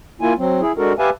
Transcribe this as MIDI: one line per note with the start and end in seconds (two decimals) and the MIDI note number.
0.21 0.33 58
0.21 0.33 64
0.21 0.33 65
0.21 0.33 80
0.38 0.61 54
0.38 0.61 60
0.62 0.72 64
0.62 0.72 68
0.78 0.93 56
0.78 0.93 62
0.78 0.93 66
0.78 0.93 69
0.78 0.93 70
0.99 1.10 67
0.99 1.10 71
0.99 1.10 76
0.99 1.10 77
0.99 1.10 80
0.99 1.10 81